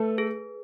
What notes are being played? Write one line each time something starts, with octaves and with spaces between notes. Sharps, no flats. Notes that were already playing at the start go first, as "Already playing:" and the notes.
Already playing: A3 A4 B4
G#4